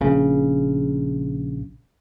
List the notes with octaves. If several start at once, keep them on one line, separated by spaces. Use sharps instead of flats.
A#1 C#3